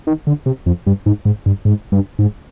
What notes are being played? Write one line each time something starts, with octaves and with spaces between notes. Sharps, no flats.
D#3
D3
C3
F2
G2
G#2
G#2
G2
G#2
G2
G#2